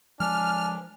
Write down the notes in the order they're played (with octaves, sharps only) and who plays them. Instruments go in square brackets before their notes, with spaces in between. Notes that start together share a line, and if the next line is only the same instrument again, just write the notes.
[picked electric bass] F3 G#3 [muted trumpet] D4 [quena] G#5 [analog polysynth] F6